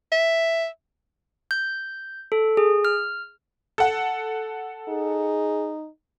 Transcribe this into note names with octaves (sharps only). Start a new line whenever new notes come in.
E5
G6
A4
G#4
F6
A4 F#5
D#4 G#4